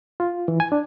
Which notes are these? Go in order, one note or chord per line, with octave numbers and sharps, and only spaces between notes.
F4
E3
G#5
D4